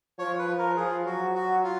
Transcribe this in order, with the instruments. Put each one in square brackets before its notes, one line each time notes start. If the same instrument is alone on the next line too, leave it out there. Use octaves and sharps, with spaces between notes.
[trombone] F3 [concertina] C#5
[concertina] B4
[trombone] F3
[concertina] A#4
[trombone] F3 [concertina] G#4
[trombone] F#3 [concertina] F#4
[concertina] F#4
F4